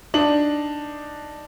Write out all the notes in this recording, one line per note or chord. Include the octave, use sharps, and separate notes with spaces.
D4 D#4 F#7